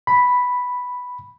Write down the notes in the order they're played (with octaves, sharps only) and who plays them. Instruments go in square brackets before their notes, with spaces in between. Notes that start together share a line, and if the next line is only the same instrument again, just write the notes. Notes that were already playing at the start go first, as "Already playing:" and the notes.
[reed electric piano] B5